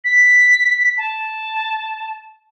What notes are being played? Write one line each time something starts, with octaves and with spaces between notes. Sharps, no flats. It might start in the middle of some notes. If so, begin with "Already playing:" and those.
B6
A5